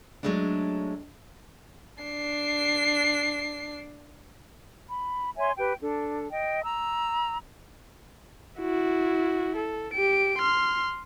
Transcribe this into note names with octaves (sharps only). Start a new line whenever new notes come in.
F#3 G#3 A3 C#4 D4
D4 C7
B5
C#5 E5 G#5 C6
G4 B4 G5
D4 A4
D#5 G5
A#5 E6
E4 F#4
A4
G4 D7
C6 F6